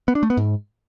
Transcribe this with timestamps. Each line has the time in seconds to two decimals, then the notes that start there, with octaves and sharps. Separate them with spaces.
0.08 B3
0.15 D4
0.23 A3
0.30 B3
0.37 G#2